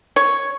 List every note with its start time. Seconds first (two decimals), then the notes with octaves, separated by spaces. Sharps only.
0.16 C#5